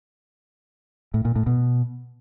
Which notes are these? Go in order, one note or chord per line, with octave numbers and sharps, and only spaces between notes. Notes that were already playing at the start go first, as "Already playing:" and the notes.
A2
A#2
A2
B2